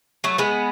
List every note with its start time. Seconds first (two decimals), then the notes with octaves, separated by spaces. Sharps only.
0.24 F#3 A3
0.38 G#3 B3